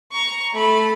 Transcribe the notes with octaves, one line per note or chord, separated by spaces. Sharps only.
A#5 C#6
A3 B5